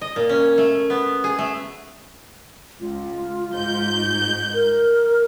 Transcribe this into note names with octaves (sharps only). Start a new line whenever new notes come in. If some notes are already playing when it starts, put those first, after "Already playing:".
D#5
A#2
C#4
A3
B3
G#4
A3
C#2 F4
G#2 G6
A#4